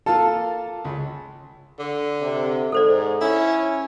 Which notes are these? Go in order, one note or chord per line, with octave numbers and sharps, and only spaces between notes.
A#3 F4 A4 A5
C#2
D3
C3
G#2 A4 C5 D5
C#4 E4